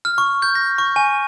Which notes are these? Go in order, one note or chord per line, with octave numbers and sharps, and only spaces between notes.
F6
C#6
G6
A#6
C#6
G#5